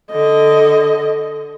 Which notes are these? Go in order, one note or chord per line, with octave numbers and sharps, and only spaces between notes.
D3 D#5